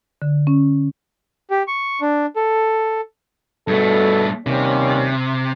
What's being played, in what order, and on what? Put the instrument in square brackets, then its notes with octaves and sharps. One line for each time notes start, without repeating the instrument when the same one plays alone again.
[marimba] D3
C#4
[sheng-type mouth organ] G4
C#6
D4
A4
[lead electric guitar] G2 A3 [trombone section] B2 A4
[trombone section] D#2 G3 C#4 [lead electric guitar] C3